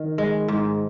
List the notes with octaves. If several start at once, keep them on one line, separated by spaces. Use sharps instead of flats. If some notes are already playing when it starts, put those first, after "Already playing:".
Already playing: D#3
G#3
G#2